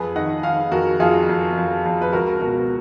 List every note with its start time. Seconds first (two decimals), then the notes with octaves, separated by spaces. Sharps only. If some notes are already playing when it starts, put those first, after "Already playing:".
Already playing: F2 G#4 B4
0.16 D#3 D#5 F#5
0.43 D#3 F5 G#5
0.71 F2 F#4 A#4
1.00 F2 F4 G#4
1.29 F2
1.57 F2
1.85 F2
2.01 B4
2.12 C#2 F#4 A#4
2.41 B2 F#4 A#4